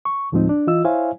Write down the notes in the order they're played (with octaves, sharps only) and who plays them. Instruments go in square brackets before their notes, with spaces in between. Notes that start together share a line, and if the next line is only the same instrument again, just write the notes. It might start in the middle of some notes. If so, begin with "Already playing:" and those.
[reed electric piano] C#6
D2 A2 F3 G#3 C4 D#4
D4
E3 F4 D#5 E6
E4 C5 C#5 E5 F5 G#5